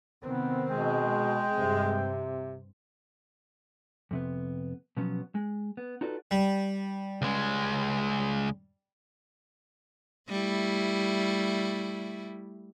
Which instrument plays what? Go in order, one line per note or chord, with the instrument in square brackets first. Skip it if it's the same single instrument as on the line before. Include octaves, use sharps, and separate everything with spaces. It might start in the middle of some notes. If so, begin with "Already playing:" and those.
[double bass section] C3 D#3 C4 [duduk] B3
[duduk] B2 [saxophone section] G#3 [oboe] G5
[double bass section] G2 C4 [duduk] C3
[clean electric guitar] F2 C3 B3
B2 F3 F#3 B3 C#4
G#3
B3
D#4 F4 F#4 A4 B4 D5
[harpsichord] G3
[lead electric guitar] C#2 G#3
[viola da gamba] G3 A3 E4